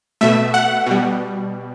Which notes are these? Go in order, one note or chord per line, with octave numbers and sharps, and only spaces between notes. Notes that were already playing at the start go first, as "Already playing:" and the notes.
B2 A3 E5
F#5
B2 G3